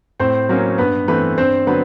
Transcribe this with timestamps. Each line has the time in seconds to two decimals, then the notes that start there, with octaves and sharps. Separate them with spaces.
0.20 A2 C4 C5
0.49 F#3 A#3 C#4
0.78 G2 B3 B4
1.08 E3 A3 B3 C4 B4
1.38 G2 C4 C5
1.67 D3 F#3 B3 B4